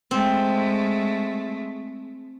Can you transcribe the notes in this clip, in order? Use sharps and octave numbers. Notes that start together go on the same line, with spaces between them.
G#3 A3 C4